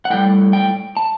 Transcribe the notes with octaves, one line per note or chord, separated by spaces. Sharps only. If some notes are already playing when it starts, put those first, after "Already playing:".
F#5
A2 G3 G5
G5
A5